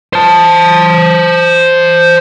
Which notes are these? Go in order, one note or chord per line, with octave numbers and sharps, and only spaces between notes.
C5 A5